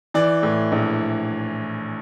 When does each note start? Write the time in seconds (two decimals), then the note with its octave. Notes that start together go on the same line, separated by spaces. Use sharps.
0.14 E3 D5
0.43 A2
0.72 A#1